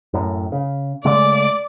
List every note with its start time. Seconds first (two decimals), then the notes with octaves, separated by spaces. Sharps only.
0.14 F#2 A2
0.52 C#3
1.05 C#3 G#3 A3 D5